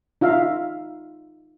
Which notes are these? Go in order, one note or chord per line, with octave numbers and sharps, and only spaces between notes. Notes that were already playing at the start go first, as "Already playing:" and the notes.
D#4 F4 E5 F5